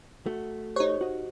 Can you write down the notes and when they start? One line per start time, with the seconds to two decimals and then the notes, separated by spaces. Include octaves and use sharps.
0.26 A3 F#4
0.76 D#4 G4 A4 C5 C#5
1.01 F#4 D#5